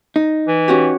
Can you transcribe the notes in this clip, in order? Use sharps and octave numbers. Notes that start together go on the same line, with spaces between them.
D#4
E3
C#4 F#4 G4